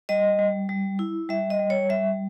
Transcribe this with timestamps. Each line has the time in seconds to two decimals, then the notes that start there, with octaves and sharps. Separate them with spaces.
0.09 G3 D#5
0.39 G3
0.69 G3
0.99 E4
1.29 G3 E5
1.50 D#5
1.59 G3
1.70 C#5
1.89 G3 E5